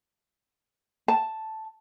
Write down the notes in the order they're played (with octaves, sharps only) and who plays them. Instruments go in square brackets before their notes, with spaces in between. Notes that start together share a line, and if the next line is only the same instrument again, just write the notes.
[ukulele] A5